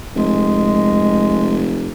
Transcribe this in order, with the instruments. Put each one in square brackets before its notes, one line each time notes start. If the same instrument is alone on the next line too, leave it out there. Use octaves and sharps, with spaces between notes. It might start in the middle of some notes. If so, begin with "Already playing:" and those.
[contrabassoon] F1 [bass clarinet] G#3